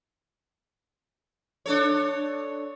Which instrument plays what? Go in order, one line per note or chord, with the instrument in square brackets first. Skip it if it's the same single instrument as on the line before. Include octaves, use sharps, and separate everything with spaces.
[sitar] D4 A4 C#5